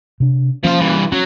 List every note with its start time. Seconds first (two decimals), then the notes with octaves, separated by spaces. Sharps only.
0.20 C3 D4
0.64 F3 A#3 C#4 F5
0.81 G2 E3
1.12 F#3 C#4